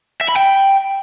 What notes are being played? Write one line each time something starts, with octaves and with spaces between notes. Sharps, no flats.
E5
B5
G5